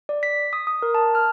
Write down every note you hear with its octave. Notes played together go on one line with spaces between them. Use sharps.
D5
B6
D#6
D#6
A#4
A5
F6